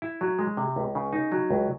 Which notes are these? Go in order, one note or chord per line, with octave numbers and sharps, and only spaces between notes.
E4
F#3
G#3
C3
C#2
C#3
D#4
F#3
C#2